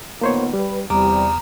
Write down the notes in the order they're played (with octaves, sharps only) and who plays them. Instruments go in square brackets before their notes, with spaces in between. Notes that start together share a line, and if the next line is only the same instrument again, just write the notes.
[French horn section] A#2 D#3 B3 [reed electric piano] A#3 C5 C#5
[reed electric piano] G3 [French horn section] B4
[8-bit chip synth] E2 [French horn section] C3 E3 G3 [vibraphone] A#5 [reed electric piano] D6